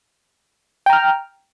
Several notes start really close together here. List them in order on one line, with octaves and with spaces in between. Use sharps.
G5 A#5 F6